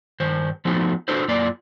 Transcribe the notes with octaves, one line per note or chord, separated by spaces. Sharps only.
G2 D#3 C5
F3 A3 B3 D#4 F4 F#4
D4 F4 F#4 A4 B4 C5
F#2 A#3 F4 D5